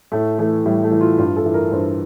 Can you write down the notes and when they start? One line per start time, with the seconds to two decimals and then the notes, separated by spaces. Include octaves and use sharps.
0.12 A2 A3
0.39 E3 A3
0.65 A2 G3
0.84 A3
0.92 E3
1.01 F4
1.18 G2 F4
1.36 A4
1.45 E3
1.54 A#4
1.72 G2 C5